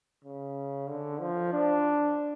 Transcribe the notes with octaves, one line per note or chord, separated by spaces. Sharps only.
C#3
D3
F3
D4